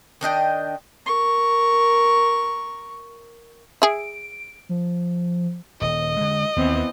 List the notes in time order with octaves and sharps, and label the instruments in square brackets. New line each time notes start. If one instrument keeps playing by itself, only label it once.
[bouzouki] D#3 D4 D#5 G5
[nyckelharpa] A#4 C#6
[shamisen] G#4 E5 [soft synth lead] D7
[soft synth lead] F3
[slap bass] D#1 [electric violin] D#5
[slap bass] D3 G#3
[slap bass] D#2 [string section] E3 B3 C4